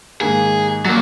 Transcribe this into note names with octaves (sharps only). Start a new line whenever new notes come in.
G#2 D#3 A#3 G#4
F#3 A#3